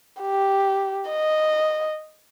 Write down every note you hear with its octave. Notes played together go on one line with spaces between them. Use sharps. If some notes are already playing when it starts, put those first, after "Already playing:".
G4
D#5